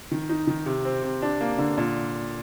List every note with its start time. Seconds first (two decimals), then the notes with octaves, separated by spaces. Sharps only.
0.12 D#3
0.29 D#4
0.47 D#3
0.66 C3
0.85 C4
1.03 C3
1.22 D4
1.41 A#3
1.58 D3
1.78 A#2